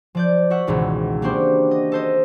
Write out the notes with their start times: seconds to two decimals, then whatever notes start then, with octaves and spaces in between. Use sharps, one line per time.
0.15 F3 D5 G6
0.50 F#4 E5 F#5
0.67 G#1 C#2 B2 D#3 E3
1.22 A#3 C4 D4 F#4 G4 C5
1.71 D#5
1.92 A4 C5 D#5